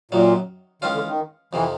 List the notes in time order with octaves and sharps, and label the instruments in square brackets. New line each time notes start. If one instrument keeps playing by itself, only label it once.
[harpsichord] F#2 D#3 F#3 [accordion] A#2
[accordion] D#3 [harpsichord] E3 G#3 C#4 F4
[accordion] D3
D#3
[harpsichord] F2 C3 D#3 [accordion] E3